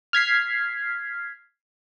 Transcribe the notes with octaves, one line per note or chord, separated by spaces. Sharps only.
F6 G#6 B6 C7